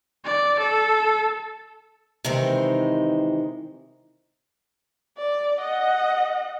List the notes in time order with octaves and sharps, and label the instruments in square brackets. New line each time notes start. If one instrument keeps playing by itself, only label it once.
[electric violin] D5
A4
[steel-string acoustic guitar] C3 D#3 E3 G#3 C4 D#4
[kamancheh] D5
D#5 F#5